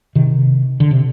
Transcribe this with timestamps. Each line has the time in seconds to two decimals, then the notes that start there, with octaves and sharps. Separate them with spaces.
0.15 C3 D#3
0.80 D3
0.91 C3